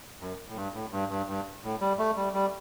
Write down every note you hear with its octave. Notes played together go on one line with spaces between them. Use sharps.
F#2
A2
G2
A2
G2
G2
G2
A2
G3
A3
G3
G3